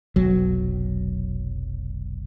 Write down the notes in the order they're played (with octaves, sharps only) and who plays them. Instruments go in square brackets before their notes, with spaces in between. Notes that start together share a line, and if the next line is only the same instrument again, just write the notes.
[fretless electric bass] F1 B1 F#3